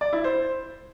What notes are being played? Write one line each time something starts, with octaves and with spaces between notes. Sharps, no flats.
D5
E4
C5